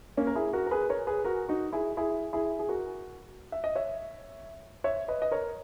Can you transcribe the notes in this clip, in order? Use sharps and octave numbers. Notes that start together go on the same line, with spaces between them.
A#3 C#4
A#4
E4 G#4
F#4 A#4
A#4
G#4 B4
A#4 C#5
G#4 B4
F#4 A#4
D#4 F#4
E4 G#4
E4 G#4
E4 G#4
G#4
F#4 A#4
E5
D#5
C#5 E5
C#5 E5
B4 D#5
D#5
A#4 C#5